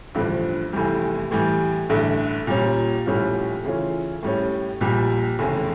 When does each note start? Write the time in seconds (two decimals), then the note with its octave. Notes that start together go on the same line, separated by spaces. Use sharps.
0.15 A1 G2 D3 F3
0.73 F1 E2 E3 G3
1.31 A2 E3 G3
1.89 A1 G2 D3 A3
2.47 A#2 G3 C#4 F4
3.06 A#1 A2 G3 C#4 F4
3.64 C#3 E3 A3 C#4 F4
4.23 A2 G3 C#4
4.81 A#1 A#2 G3
5.39 F1 E2 C#3